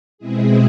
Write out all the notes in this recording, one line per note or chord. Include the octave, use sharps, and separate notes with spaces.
B2 G#3 C4 E4 G#4